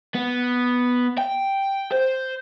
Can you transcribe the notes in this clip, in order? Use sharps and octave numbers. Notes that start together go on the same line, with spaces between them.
B3
G5
C5